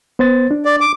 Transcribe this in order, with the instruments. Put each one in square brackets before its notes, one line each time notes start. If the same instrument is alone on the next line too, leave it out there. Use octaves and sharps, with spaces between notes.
[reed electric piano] B3 C5 A6
D4
[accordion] D5
D6